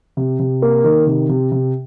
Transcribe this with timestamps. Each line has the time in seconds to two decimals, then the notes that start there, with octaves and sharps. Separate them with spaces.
0.17 C3
0.39 C3
0.62 A#3
0.84 D#3
1.07 C3
1.29 C3
1.52 C3